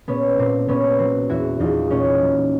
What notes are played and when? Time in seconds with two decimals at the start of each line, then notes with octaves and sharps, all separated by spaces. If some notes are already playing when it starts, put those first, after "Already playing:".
0.08 A#2 B3 C#4
0.39 A#2 C4
0.68 A#2 B3 C#4
0.99 F#3 C4
1.29 E2 E4 F#4
1.60 E2 D#4 F4
1.90 A#2 C#4 D#4
2.21 F#3